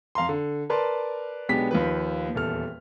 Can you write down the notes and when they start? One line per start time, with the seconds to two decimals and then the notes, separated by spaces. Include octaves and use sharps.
0.15 F2 F5 A#5 C6
0.29 D3
0.70 A#4 B4 D5 A5 C6
1.49 B1 G#3 B3 D4 G4 B6
1.71 D#2 F3 B4
2.35 D#1 E2 A4 F6